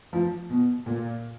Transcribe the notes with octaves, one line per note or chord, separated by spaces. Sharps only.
F3
B2
A#2